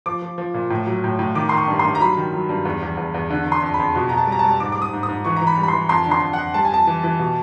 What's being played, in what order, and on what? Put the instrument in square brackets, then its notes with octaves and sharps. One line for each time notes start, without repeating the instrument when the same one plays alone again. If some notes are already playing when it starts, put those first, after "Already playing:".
[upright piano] F3 D6
F3
F3
A#2
A2
F#3
A2
A2
D#3 D6
D#3 C6
C#6
G2
C6
G2
A#5
F#3 B5
D#3
F#3
G2
E2
E2
E2
E2
D3
D3
C6
F2
B5
F2
B2
B2 A#5
A5
G3 A#5
A5
G3
G#2 D6
G3 D6
D#6
G#2
D#6
G#2
E3 C#6
E3 A#5
B5
G3
B5
E3 C6
F2 C6
D3
C6
F2
F2 F#5
G3 A5
G#5
F2 A5
E3
E3
B2